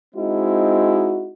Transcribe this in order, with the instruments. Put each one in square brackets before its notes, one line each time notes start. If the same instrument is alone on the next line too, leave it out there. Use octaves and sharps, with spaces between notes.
[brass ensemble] G#3 C4 D#4 E4 F#4